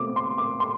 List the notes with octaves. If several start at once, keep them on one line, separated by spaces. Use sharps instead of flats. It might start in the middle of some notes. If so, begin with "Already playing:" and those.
Already playing: B2 A3 C4 D6
C6
D6
C6